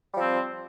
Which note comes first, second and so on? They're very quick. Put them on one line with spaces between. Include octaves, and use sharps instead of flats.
G3 F3 C4